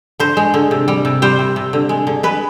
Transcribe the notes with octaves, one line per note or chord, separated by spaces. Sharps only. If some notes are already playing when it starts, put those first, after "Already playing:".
D3 C5
G#3
D3
C3
G3
C3
G3 C5
C3
C3
D3
G#3
D3
G#3 B4